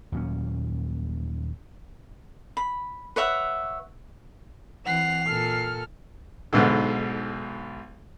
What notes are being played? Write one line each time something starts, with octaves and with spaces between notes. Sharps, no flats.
D#2 A#2 F#3 C#4
B5
B4 C#5 E5 F#5
E3 C4 F#5 C7 F7
A#2 A4 F6
B1 G#2 B2 D3